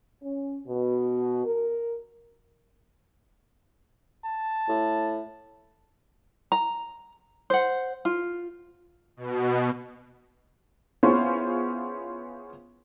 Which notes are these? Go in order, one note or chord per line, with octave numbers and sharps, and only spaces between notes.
C#4
B2
A#4
A5
A2
A#5
C5 F#5
F4
B2
B3 C#4 E4 F4 G#4 C5